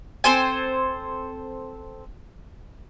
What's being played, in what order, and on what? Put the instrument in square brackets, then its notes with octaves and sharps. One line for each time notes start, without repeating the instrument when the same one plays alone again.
[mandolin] C4 A4 C5 G#5